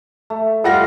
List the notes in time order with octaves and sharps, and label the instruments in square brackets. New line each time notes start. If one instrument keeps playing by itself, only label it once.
[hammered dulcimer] A3
[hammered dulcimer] G3 [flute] F4 [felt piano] A4 F#5 A#6